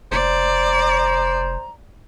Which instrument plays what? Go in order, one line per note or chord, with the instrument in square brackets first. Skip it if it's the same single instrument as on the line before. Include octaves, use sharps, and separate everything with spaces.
[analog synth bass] F1 [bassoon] C5 [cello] D5 [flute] A#5